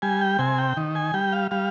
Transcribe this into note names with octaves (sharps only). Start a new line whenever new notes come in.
G3 G#5
G5
C3 G#5
G5
D#3
G#5
G3 G5
F5
G3 F5